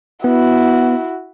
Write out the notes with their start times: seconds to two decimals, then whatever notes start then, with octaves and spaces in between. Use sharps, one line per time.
0.24 B3 E4 F#4